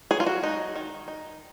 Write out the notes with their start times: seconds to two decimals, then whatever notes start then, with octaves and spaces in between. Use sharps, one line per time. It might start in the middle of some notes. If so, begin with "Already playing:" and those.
0.11 F#3 G#4
0.20 F4
0.26 F#4
0.43 G#3 D#4
0.75 D#3
1.08 D#4